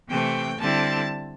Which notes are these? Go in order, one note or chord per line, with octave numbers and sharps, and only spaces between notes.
C3 E3 A3 G5
D3 G3 C4 E4 A5